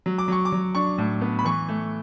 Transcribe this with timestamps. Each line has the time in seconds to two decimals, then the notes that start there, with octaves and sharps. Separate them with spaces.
0.06 F#3
0.18 D6
0.28 F#3 C#6
0.45 D6
0.52 F#3
0.75 D4 C#6
0.98 A2
1.21 B3
1.39 B5
1.45 E3 C#6
1.68 A3